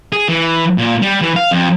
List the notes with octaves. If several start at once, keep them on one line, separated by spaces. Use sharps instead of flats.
G#4
E3
A#2
G3
E3
F5
F2